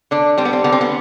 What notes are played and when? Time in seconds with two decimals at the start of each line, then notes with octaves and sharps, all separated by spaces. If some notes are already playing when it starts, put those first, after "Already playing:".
0.11 D3 D4
0.38 G3 C4
0.45 B3
0.53 C4
0.64 D3 B3
0.72 C4
0.81 B3